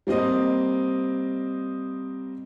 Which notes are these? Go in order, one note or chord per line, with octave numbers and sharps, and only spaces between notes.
G3 A#3 C4 D#5